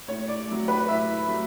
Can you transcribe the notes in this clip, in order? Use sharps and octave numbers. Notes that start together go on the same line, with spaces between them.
A2 C#5
D5
F#3 A3
B4
A2 E5
F#3 A3